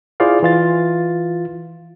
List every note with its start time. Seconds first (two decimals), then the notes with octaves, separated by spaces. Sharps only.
0.20 E4 F4 G#4 C5 D5 F5
0.43 E3 F4 A6